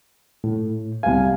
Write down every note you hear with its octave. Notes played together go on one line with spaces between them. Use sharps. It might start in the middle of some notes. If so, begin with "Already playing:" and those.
A2
C2 F5 G#5